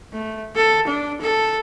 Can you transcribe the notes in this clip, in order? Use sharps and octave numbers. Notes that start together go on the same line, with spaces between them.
A3
A4
D4
A4